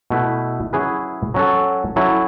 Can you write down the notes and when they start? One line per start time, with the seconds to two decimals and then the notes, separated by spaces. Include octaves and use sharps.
0.10 B2 A3 E4 B4
0.73 F#3 C#4 E4 G#4 B4
1.34 F#3 C#4 F#4 A4
1.96 F#3 C#4 E4 A4